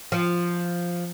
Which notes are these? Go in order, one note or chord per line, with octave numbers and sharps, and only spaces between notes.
F3